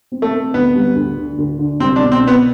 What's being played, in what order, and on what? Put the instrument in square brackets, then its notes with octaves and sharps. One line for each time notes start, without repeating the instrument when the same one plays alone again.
[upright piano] C4
[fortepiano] A3
[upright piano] C4
[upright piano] D2 [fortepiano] B3
[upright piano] G3
D2
D3
D2
D3
[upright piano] C2 [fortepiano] C4
[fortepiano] D4
[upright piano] B2
[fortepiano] C4
[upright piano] B2 [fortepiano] B3